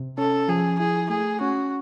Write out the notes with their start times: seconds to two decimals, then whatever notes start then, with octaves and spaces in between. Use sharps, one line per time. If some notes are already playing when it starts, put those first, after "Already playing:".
Already playing: C3
0.18 C#4 A4
0.48 F3 G#4
0.79 E4 G#4
1.09 A3 G#4
1.41 C#4 F#4